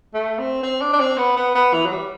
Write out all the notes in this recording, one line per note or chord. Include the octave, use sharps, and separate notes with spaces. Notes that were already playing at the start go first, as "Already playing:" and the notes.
A3
C4
C4
D4
D4
C4
B3
B3
B3
E3
F#3
G3